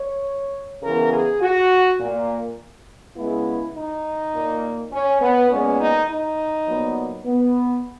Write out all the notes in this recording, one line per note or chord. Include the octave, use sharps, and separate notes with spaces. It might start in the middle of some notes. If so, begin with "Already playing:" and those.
Already playing: C#5
C#3 E3 B3 A#4
G#4
F#4
A#2 A#3
C#3 G#3 B3 E4
D#4
A#2 A#3
C#4
B3
A#2 G#3 B3 C#4
D#4
D#4
A#2 F#3 B3
B3